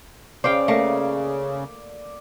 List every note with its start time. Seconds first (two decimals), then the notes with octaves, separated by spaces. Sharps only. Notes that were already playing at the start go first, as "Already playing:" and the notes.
0.44 C#3 C5 D5 F5 G5
0.68 A3 A#3